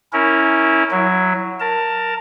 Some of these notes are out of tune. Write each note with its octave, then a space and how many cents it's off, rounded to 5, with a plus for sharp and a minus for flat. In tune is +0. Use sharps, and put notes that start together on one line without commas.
C#4 +0 E4 -20 A#4 +0
F#3 +0 E4 +15
A#4 +0 A5 +20